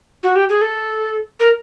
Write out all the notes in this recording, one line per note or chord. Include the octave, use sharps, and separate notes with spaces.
F#4
G4
G#4
A4
A#4